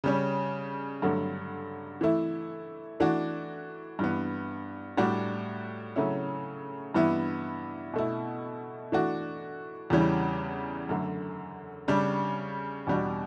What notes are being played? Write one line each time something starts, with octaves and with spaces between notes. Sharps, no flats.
C#3 G3 C#4
G2 D3 F#3 A3
E3 A3 E4
E3 A3 D4 F#4
G2 E3 B3
A2 G3 D4 F#4
C#3 F#3 A3 C#4 E4
G2 E3 B3 E4
B2 A3 E4
E3 A3 D4 F#4
E2 C#3 E3 G3 C#4
F#2 D3 A3
C#3 G3 D4
E2 B2 G3 D4 F#4